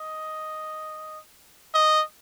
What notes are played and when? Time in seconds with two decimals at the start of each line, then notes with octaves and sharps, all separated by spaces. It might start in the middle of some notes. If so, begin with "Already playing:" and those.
Already playing: D#5
1.74 D#5